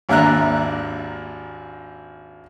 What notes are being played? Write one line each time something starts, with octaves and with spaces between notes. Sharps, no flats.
G#1 D#2 D4 E5 A#5 F#6